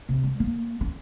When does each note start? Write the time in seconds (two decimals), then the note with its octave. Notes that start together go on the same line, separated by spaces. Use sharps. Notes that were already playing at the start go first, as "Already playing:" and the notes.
0.09 C3
0.23 G3
0.40 A#3
0.81 C#4